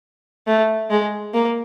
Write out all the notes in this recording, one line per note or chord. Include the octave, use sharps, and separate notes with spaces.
A3
G#3
A#3